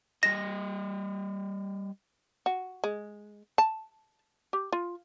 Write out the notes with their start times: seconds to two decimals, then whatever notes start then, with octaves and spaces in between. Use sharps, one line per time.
0.23 G3 D#5 A#6
2.46 F#4
2.84 G#3
3.58 A5
4.53 G4
4.72 F4